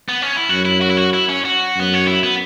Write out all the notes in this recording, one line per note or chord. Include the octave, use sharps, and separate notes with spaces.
B3
C#4
E4
F#2 F#4
E4
F#4
E4
F#4
E4
C#4
F#4
F#2 B3
C#4
E4
B3